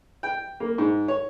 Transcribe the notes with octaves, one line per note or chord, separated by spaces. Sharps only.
G5
A#3
G#2
C#5